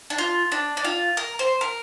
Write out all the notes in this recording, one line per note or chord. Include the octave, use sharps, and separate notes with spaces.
D4
F4
D4
D4
F4
A#4
C5
A#4